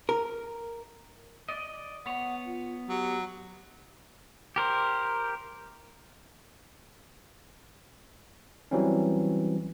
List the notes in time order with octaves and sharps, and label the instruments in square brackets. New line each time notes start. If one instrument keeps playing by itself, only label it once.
[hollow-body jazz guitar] A#4
[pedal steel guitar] D5 D#5
[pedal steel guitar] B3 C#5 [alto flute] F#5
[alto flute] F4
[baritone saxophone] F#3 [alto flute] G4
[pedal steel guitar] G4 A#4 C5
[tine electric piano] E3 F#3 G3 C4 C#4